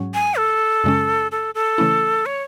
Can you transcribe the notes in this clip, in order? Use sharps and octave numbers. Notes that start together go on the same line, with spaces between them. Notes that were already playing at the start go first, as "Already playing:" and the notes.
Already playing: G#2 F#3 C#4
G#5
A4
F#2 C#3 G#3 C#4
A4
A4
C#3 E3 A3 C#4 E4
C#5